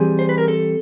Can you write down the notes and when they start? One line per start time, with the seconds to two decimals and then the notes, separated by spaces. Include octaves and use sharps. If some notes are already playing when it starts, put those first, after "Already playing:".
Already playing: E3 G3 C4 G#4
0.19 C5
0.29 B4
0.38 A#4
0.48 A4